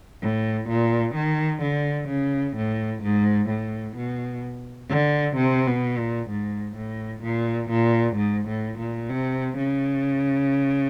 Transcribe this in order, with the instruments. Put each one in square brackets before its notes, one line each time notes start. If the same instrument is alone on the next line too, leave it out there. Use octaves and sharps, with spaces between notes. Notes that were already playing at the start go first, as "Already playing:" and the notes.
[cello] A2
A#2
D#3
D3
C#3
A2
G#2
A2
B2
D3
C3
B2
A#2
G#2
A2
A#2
A#2
G#2
A2
A#2
C3
C#3